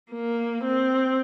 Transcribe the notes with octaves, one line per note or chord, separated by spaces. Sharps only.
A#3
C4